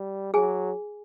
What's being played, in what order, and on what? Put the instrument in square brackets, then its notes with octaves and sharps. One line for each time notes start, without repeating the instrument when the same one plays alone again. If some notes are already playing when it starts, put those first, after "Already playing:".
Already playing: [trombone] G3
[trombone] F#3 [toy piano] G#4 G#5